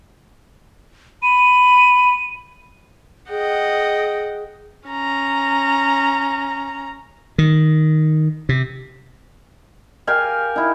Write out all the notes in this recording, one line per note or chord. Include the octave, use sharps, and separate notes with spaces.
B5 D#7
G#4 D#5 F#5 G5
C#4 A#5
D#3
C3
G4 A#4 F5 G#5
D#4 E4